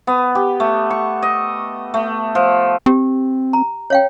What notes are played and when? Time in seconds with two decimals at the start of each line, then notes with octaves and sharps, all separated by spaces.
0.07 B3
0.35 G4
0.60 A3
0.90 C#6
1.23 D#5
1.94 A3
2.35 F3
2.86 C4 G4
3.53 A#5
3.90 C#5 F5 G5